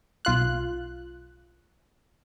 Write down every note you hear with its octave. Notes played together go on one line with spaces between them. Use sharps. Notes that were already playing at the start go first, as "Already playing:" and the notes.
B1 F4 F#6